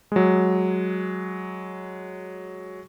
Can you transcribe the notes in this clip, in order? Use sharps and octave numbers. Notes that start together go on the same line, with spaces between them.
F#3 G#3